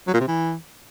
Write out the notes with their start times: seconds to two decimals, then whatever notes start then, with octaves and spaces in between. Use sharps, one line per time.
0.07 F#3
0.14 A#2
0.21 C3
0.28 E3